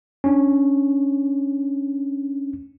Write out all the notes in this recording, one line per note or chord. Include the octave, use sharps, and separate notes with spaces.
C#4 D4